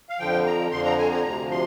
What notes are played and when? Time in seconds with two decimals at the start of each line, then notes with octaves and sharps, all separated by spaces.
0.09 F5
0.19 F2 D3 F3 G5
0.46 A#5
0.71 F2 D3 F3 C6
0.85 A#5
0.98 G#5
1.11 A#5
1.24 D2 C3 F3 A#5
1.51 C6